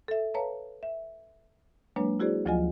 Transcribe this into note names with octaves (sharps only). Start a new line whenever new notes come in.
A4 E5
B4 C#5 F5 A5 A#5
E5
F#3 G#3 A#3 D4 B4 C#5
E4 F#4 G#4 C5 D5
D2 F3 F#3 F4 D#5 G#5